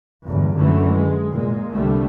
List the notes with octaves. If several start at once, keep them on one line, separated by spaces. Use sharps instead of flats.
G1 E2
F#2 D3 E3 F#3 A3
G#3
A#2 G#3
C2 D3 G3 A3